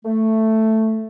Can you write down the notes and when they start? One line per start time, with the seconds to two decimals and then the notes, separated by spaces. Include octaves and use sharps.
0.05 A3